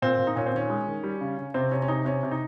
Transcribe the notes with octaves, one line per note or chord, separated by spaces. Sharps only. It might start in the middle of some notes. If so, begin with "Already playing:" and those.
A#2 C4
A#2
D#4
A#2 C#4
C4
D#3 C#4
G#3
D#3
G3
C#3
C#3
C3 C4
C3 C#4
C#4
C3 D#4
C3 C#4
C3
D#4